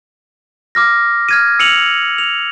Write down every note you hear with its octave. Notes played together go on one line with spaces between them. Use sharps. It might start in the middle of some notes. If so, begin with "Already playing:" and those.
D6 F6 A#6
F6 G#6 D#7
E6 C#7 D#7 F7 F#7
F7